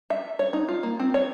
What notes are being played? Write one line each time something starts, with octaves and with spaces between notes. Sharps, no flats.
E5
C#5
D#4
F4
A#3
C4
C#5